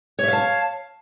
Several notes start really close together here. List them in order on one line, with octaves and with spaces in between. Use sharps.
C#5 E5 F5 A5